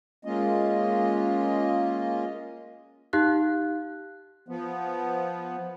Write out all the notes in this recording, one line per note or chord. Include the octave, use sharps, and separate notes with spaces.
G#3 A#3 C#4 F4 D#5
D#4 G4 F5 F#6
F3 B3